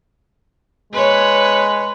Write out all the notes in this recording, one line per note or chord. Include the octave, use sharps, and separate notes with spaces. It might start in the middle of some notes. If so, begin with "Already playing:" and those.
G#3 B4 C#5